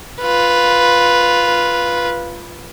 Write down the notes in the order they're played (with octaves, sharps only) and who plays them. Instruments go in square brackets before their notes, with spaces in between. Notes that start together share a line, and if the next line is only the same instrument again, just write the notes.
[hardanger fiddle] F4 B4